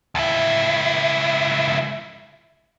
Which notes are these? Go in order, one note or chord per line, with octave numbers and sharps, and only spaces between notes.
C#2 E4